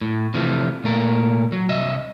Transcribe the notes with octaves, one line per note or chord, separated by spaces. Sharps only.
A2
C3 E3 F3 A3
A#2 A3 A#4
F#3
C2 D#5 E5